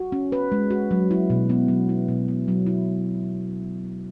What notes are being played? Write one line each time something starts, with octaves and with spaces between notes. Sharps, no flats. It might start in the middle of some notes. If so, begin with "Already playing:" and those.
Already playing: F#4
C#4
B4
G#3
F#4
F#3
E4
B2
B3
F#3
E4
B2
B3
F#3
E4